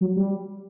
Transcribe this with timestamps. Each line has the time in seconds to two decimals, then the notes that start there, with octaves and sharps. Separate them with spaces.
0.01 F#3
0.16 G3